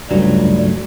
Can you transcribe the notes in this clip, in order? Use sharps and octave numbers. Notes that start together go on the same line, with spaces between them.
C#2 G2 F#3 G3 A3